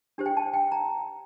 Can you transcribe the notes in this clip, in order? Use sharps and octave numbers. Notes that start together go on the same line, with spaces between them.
D4 G4 C5
G5
A5
G5
A#5